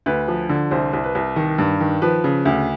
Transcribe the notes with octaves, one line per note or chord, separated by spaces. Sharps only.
D2 B4
F3
D3
C2 C5
C2
B4
C2
D#3
G2
D#3
F3 B4
C#3
D2